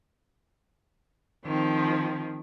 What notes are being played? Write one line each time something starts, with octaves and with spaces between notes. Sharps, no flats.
D#3 F3 C4